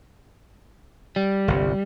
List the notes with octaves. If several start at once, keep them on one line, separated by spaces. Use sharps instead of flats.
G3
G1 C2